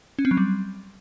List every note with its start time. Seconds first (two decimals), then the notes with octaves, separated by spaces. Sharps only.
0.19 C#4
0.25 C4
0.31 F#3
0.37 G3